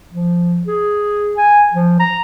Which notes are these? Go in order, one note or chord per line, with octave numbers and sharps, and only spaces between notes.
F3
G#4
G#5
F3
A#5